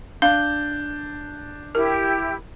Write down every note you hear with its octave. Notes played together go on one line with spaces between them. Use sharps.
D4 F5 G6
E4 G4 A#4